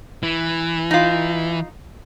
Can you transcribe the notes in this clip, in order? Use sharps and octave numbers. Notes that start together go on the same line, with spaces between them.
E3
D#4 F4